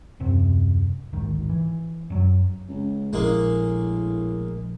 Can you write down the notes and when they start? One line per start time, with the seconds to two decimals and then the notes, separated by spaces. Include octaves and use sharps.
0.20 D#1 F#2 C3 C4
1.13 A1 D2 G#2 D#3
1.50 E3
2.10 F#2 F#3
2.69 C#2
3.13 A#1 A2 G#3 A#3